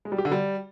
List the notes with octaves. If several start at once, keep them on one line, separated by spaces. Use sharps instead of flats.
G#3
G3
G4
D3
G3